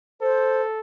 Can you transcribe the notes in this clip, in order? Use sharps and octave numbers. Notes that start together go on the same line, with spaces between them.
A4 C5